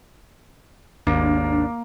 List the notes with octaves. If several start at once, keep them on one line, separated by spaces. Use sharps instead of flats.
G#1 D#2 A#3 D4